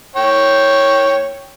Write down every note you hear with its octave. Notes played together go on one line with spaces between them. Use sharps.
C#5 G5